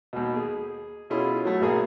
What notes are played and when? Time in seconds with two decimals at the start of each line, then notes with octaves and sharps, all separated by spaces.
0.13 D#2 B2
0.36 G#4
1.10 B2 C#4 E4 F4 G#4
1.45 F#3 A3
1.60 G#1 B2 A#3 G#4 G#5